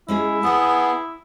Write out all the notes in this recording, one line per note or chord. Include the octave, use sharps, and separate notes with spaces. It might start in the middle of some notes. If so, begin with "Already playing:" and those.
G#3 C#4 E4 G#4
B3 G#4 F#5 A5